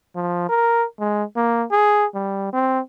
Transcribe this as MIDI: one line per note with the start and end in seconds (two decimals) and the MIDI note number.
0.16 0.48 53
0.49 0.85 70
0.99 1.24 56
1.36 1.64 58
1.72 2.05 68
2.14 2.50 55
2.53 2.80 60